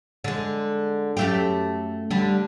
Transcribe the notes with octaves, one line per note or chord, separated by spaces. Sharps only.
D3 G#3
F#2 A3 G4
D3 G3